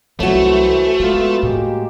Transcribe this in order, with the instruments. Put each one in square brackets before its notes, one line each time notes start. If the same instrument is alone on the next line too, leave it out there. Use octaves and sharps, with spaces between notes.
[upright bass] C2 F#3 [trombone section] E3 E4 C5 [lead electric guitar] A3 [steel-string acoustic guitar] F#4 C#5
[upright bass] G#3 [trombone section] B3 F4
[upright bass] A2 [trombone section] G#3 A#3 G4